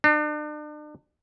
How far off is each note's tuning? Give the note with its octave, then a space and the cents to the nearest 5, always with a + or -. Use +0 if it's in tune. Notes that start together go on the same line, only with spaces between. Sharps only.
D4 +40